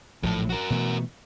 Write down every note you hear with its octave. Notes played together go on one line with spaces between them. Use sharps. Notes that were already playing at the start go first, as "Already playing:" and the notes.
A#1 A2 F3 F#3 A4
F#4 A#4
B2 E3 A3